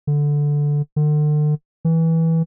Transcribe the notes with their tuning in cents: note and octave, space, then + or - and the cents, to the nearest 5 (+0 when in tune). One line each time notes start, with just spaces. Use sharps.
D3 -5
D3 +40
E3 -15